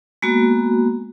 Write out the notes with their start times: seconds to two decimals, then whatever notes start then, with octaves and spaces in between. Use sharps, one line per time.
0.22 G#3 A#3 B3 F#4